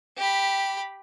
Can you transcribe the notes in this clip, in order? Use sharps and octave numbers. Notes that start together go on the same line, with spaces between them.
G4 B5